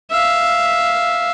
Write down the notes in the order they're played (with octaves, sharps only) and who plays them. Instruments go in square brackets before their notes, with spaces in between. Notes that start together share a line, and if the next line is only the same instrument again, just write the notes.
[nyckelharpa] E5 F5